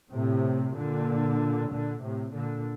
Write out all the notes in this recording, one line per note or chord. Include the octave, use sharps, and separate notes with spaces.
A2 C3
A#2 D3
A#2 D3
A2 C3
A#2 D3